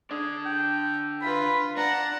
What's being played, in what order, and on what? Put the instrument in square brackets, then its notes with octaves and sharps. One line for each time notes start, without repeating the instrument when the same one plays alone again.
[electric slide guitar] D3 D4 D5 [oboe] G#4
[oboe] G5
[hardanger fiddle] F4 B4 [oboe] B5
[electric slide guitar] D4 [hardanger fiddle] F#5 [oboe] A#5